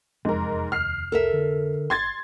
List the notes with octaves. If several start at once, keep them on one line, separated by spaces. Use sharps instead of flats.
F1 E2 G#2 A#4
D#2 F6 C7
C2 A4 A#4 E5
D3
G1 C6 G#6 A6